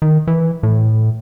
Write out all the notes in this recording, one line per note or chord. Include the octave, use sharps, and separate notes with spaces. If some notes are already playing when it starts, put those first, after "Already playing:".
D#3
E3
A2